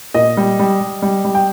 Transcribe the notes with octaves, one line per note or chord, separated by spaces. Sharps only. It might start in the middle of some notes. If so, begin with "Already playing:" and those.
A#2 D#5
G3
G3
G3
G3
G3
G5